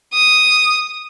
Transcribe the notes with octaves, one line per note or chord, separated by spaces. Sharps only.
D#6